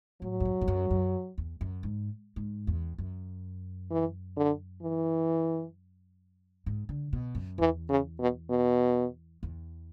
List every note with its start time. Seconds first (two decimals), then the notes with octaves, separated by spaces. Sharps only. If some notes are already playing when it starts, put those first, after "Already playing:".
0.22 A2 F#3
0.40 E2
0.45 F#2
0.61 G#2
0.68 F#2
0.91 F#2
1.38 E2
1.61 F#2
1.83 G#2
2.36 G#2
2.67 E2
2.98 F#2
3.90 E3
4.37 D3
4.82 E3
6.66 G#2
6.89 D3
7.13 B2
7.35 F#2
7.58 E2 E3
7.89 C#3
8.20 B2
8.50 B2
9.43 E2